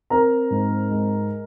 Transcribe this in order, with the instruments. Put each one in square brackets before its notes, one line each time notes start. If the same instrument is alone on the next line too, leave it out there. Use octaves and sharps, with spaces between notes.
[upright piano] C4 A#4 A#5
G#2
G#3